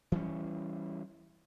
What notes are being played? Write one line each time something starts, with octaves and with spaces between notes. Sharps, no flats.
E3 G3 C#4